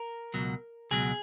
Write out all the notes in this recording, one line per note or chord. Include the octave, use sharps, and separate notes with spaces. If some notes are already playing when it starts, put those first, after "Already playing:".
Already playing: A#4
C#2 B2 F#3
C#2 B2 F#3 G#4